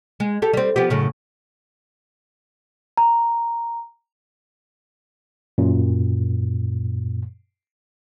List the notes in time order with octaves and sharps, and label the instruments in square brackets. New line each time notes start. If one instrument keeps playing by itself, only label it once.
[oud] G#3
G4 A4
G3 C4
F3 B3 G4
F#2 A2 C#3
[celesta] A#5
[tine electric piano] F#2 A#2